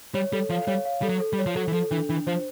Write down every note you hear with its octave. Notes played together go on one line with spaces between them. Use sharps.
G3 C#5
G3 A4
F3 F5
G3 C#5
F5
G3 A4
F#3
A4
G3
C#5
F3
F#3 A4
E3
F3 A4
E3 D4
E3 D4
F3 C5